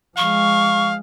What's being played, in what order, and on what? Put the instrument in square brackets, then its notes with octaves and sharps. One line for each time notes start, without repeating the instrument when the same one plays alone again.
[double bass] F3 G#3 [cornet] F5 [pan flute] C#6